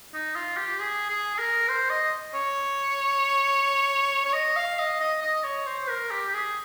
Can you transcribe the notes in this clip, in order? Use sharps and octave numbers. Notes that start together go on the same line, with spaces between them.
D#4
F4
G4
G#4
G#4
G#4
A#4
C5
D#5
C#5
C#5
D#5
F5
D#5
D#5
D#5
C#5
C5
A#4
G4
G4
G#4